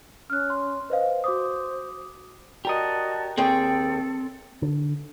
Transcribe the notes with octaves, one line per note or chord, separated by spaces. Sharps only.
C#4 F6 F#6
C6
B4 C5 D#5 F5
F#4 C5 D6 D#6
F#4 G4 A#4 D5 D#5 A5
D#2 C4 G#4 A4 G5
D3